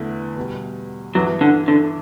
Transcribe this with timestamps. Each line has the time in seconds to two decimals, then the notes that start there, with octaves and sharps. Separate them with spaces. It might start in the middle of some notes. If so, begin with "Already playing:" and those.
Already playing: E2 D3 A3 E4 B4
0.36 E2 B2 G3
1.15 G2 E3 F#3 B3
1.41 D3
1.68 D3